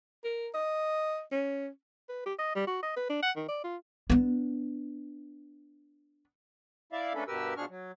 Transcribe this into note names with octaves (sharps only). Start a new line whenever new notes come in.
A#4
D#5
C#4
B4
G4
D#5
G3
F#4
D#5
B4
D4
F#5
D#3
D5
F4
B3 D4
E4 D5 E5 F5
A3 A#3 C#4 D4 A4 B4
G2 B2 G4 A#4 B4 E6
B2 F3 D4 G#4 C#6 F6
F#3